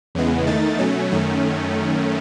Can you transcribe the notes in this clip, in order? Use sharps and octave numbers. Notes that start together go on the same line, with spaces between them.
E2 C#3 E3 G#3 B3
E2 D#3 A3 D#4 A6
B2 F#3 A3 C#4
F#2 D#3 A3 C#4